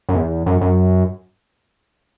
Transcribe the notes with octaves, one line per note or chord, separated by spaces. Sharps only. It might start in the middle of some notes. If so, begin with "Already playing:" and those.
F#2
E2
F#2
F#2